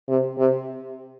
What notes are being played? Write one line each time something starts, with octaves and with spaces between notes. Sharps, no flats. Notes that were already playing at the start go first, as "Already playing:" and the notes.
C3
C3